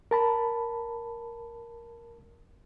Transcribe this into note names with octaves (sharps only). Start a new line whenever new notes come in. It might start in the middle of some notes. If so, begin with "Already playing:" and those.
A#4 A5 B5